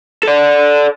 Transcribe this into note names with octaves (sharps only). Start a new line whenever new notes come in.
A4 D5